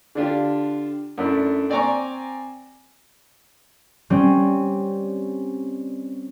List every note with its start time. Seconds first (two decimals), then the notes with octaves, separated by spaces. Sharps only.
0.15 D3 D4 F4 G4
1.18 F#2 A3 D4 E4
1.70 C4 D5 G#5 A#5 C#6 D6
4.10 G3 C4 C#4